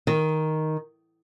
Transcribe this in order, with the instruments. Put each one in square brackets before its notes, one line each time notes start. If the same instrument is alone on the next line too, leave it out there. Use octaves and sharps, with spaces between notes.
[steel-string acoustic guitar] D#3